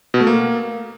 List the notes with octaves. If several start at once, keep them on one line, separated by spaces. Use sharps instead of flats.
B2
A3
A#3